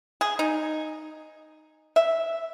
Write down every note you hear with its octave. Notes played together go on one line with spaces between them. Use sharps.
G#4
D#4
E5